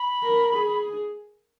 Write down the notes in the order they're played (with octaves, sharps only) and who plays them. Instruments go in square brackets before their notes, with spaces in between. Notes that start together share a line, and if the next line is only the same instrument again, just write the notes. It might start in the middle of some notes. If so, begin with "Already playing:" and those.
Already playing: [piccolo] B5
[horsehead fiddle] A#4
G#4